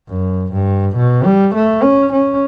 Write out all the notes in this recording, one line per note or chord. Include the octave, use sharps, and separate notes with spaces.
F#2
G2
B2
G3
A3
C#4
C#4